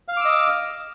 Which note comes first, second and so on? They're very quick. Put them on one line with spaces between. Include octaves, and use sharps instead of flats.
F5 F6 D6 E6 D#5